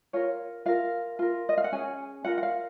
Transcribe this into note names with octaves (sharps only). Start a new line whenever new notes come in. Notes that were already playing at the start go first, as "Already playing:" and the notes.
F4 A#4 C#5
F4 A#4 F5
F4 A#4
D#5
F5
F#5
C#4 G#4 G#5
F4 A#4 F#5
F#5
F5